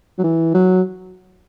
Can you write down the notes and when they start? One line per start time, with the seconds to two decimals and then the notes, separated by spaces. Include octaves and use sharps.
0.18 F#3
0.24 E3
0.54 F#3